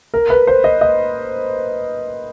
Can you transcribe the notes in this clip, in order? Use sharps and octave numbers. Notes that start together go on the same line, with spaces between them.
A#4
B4
C5
D#5
D#5